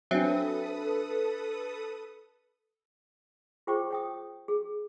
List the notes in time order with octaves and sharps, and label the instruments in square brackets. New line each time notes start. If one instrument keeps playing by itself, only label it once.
[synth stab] F#3 C4 [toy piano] D4 E5 [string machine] A4 B4 D#6
[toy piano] F4 G#4 C5 G5 C#6 D6
C#5 G5 D#6
G#4